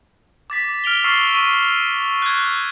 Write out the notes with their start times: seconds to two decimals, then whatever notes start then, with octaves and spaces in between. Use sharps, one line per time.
0.50 D6 A6 B6
0.84 F6 D7 F7 G7
1.04 C#6 E6 A6 C7 G7
1.34 C#6 D#7
2.22 F#6 G#6